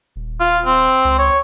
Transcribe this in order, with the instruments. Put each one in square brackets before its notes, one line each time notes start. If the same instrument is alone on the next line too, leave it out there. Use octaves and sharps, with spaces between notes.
[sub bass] D#1
[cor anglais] F4
C4
[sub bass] C#2
[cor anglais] C#5